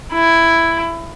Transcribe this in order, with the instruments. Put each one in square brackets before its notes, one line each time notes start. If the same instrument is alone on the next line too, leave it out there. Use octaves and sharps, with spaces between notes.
[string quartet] E4